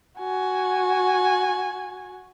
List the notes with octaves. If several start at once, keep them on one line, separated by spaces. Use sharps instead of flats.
F#4 G#5